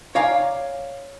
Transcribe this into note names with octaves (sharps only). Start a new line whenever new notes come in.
C#5 D5 F5 G#5 A#5